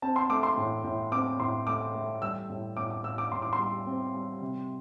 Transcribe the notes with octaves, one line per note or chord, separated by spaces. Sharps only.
C4 A5
C6
A3 D6
C6
A2
A2
C4 D6
A2 C6
A3 D6
A3
G3 E6
A2
A2 D6
D6
A2 E6
D6
A2 C6
D6
C6
G3
C4
G3
C3